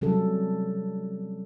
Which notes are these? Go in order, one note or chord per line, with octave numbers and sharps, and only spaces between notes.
C3 F#3 G3 C#4 A4